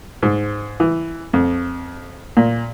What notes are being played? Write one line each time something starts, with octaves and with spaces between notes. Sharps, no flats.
G#2
E3
F2
A#2